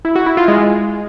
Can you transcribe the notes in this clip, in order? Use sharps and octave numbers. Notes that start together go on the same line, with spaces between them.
E4
F#4
E4
F4
G#3